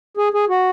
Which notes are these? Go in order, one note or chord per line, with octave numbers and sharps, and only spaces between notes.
G#4
G#4
F#4